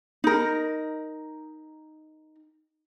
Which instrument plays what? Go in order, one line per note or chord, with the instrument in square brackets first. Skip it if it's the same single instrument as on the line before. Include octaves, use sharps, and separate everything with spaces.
[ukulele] D#4 A#4